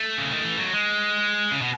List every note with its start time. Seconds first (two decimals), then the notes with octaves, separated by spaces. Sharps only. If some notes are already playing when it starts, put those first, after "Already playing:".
Already playing: A3
0.18 C#3
0.32 D#3
0.44 E3
0.59 F#3
0.72 G#3
1.51 C#3
1.62 B2